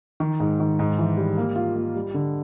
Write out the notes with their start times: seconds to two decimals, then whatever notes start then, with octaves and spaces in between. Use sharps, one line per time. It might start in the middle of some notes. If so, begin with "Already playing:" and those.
0.20 D#3
0.40 G#2
0.60 D#3
0.79 G#2
0.99 E3
1.17 G3
1.37 A#3
1.56 F4
1.76 A#3
1.95 G3
2.14 D3